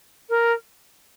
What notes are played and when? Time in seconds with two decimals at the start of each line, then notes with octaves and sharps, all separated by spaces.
0.29 A#4